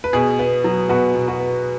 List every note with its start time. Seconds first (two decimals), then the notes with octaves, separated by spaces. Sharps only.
0.04 B4
0.13 B2 G#4
0.39 B3
0.64 F#3
0.89 B2 F#4 B4
1.15 B2
1.28 F#4 B4
1.40 B3